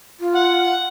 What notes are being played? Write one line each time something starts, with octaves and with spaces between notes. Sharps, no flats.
F4
F#5